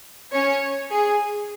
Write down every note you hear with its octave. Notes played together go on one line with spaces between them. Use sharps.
C#4 C#5
G#4